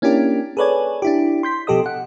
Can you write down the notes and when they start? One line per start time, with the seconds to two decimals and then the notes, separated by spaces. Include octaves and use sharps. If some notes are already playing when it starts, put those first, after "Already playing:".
0.02 A#3 C#4 D4 E4 G4 A#4
0.57 G#4 A4 B4 C#5 D5 G#5
1.02 D4 E4 G4
1.43 C6 G6 B6
1.67 B2 F3 G4 A4 D#5 D#6
1.86 F#5